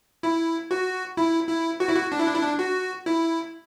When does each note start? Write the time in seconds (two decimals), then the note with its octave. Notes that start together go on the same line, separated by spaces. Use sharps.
0.23 E4
0.71 F#4
1.17 E4
1.49 E4
1.80 F#4
1.89 E4
1.96 F#4
2.12 D4
2.19 E4
2.27 D4
2.35 E4
2.43 D4
2.59 F#4
3.06 E4